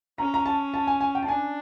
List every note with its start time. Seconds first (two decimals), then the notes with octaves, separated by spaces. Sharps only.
0.18 C#4 A#5
0.34 A#5
0.46 A5
0.74 A5
0.87 G#5
1.01 G#5
1.15 G5
1.23 A5
1.28 D4 G#5